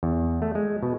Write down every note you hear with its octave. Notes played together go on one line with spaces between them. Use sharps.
E2
A3
G#3
B2